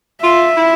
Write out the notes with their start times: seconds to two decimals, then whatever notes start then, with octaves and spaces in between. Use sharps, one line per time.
0.23 F4 E5
0.57 E4